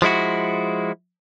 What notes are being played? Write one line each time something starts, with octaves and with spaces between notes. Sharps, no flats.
F3 G#3 E4 F#4